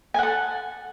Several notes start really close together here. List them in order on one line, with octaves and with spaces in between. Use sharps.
G#5 F#5 A4